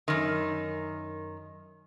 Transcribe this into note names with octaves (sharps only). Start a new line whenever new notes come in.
F#2 D#3